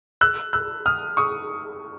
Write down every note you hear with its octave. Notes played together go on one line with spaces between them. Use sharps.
E6 F#6
E6 F#6
D#6 F6
C#6 D#6